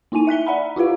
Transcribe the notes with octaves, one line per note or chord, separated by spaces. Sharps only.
A#3 D#4 E4 G#5 D#7
E5 F#6 B6 G7
D5 E5 F#5 A#5 B5
E4 F4 G4 B4 F5